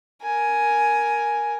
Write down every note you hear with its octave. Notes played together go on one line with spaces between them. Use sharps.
A#4 G#5